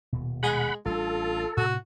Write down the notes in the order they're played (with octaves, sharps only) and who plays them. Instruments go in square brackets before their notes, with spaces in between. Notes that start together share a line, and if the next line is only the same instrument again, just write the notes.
[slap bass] D#1 B2
[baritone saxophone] G#3 [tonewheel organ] F#5 B5
[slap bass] A1 G3 D4 [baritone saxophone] F4 [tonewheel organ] A4
[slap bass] A2 C3 [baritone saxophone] F#4